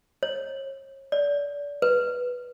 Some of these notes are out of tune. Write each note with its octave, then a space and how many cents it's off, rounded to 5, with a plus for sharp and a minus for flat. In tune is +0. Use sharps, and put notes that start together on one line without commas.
C#5 -35
D5 -30
B4 -5